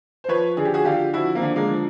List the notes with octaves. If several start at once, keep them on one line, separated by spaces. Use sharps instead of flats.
C5
F3 B4 C#5
D3 G#4
G4
F#4 G#4
D3 F4 G4
F3 E4 F#4
A#3 C4
D3
G#3 A#3
F3